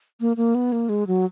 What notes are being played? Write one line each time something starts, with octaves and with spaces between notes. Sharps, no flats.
A#3
A#3
B3
A#3
G#3
F#3